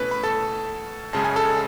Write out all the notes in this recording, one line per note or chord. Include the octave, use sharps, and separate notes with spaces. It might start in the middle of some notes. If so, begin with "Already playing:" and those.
Already playing: B2 A3 C#4 E4 B4
B5
A4 A5
F#2 C#3 G#3 C#4 A5
G#5
A4 A5